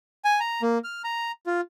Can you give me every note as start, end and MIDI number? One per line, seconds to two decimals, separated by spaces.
0.25 0.39 80
0.40 0.62 82
0.62 0.78 58
0.84 1.02 89
1.04 1.32 82
1.46 1.61 65